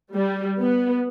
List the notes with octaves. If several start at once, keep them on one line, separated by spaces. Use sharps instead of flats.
G3
B3